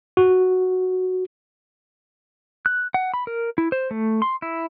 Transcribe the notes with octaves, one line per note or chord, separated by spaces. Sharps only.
F#4
F#6
F#5
B5
A#4
E4
C5
A3
C6
E4